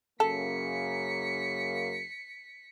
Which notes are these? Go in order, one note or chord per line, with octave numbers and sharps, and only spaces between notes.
F#2 C#3 A#3 A4 B6 C#7